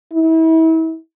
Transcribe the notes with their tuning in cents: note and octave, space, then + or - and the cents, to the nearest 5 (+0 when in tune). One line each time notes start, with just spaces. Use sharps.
E4 -35